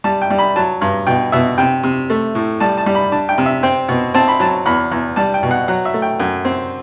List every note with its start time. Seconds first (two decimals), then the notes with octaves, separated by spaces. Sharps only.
0.04 G3 A5
0.22 G5
0.30 G3
0.38 B5
0.56 F#3 A5
0.81 G2
1.07 B2 G5
1.32 B2 E5
1.58 C3 G5
1.84 C3
2.10 A3
2.35 A2
2.60 G3 A5
2.77 A5
2.86 G3
2.95 B5
3.12 D4 A5
3.29 G5
3.38 C3
3.46 E5
3.63 C4 G5
3.89 B2
4.14 C4 A5
4.28 B5
4.39 F#3 A5
4.66 E2 B5
4.92 E2
5.16 G3 A5
5.34 G5
5.43 B2
5.51 F#5
5.68 F#3 F#5
5.85 E5
5.94 A3
6.02 G5
6.20 F#2
6.45 C4